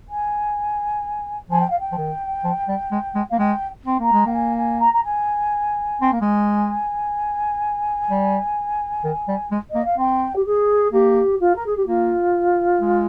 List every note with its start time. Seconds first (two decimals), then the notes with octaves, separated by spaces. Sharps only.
0.09 G#5
1.50 F3 G#5
1.60 G5
1.70 F5
1.79 G5
1.92 F3
1.97 D#3
2.44 F3
2.68 G3
2.92 G#3
3.15 G#3
3.29 A#3 F5
3.39 G#3 G5
3.86 C4
4.00 A#3 A#5
4.12 G#3
4.26 A#3 G5
4.33 G#5
4.56 G#5
4.80 A#5
4.93 A#5
5.03 G#5
6.02 C4
6.12 A#3
6.21 G#3 G#5
8.10 G3
9.04 D#3
9.28 G3
9.51 G#3
9.70 A#3 D#5
9.84 F5
9.98 C4 G5
10.35 G4
10.45 G#4
10.92 A#3 G4
11.40 F4
11.55 A#4
11.66 G#4
11.76 G4
11.86 A#3 F4
12.81 G#3